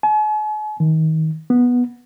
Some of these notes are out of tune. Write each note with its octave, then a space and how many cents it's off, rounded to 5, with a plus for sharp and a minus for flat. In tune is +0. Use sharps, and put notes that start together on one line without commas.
G#5 +45
D#3 +30
B3 -10